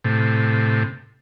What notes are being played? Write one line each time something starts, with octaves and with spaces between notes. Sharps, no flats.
A2 C3